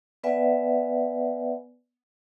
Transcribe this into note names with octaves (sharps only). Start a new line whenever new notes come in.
B3 B4 D5 E5 F#5 G#5